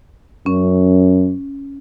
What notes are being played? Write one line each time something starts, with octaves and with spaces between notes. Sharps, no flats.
F#2 C#4